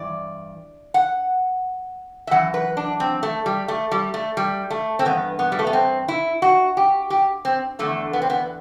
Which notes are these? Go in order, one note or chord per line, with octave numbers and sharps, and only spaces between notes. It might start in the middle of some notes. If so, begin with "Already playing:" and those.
Already playing: G2 E3 D5
F#5
E5
F#2 E3 F#5
B4
D4
C4
A3
G3
A3
G3
A3
G3
A3
C4
G2 E3 B3
B3
G3
A3
B3
C4
E4
F#4
G4
G4
C4
E2 D3 A3
B3
C4
B3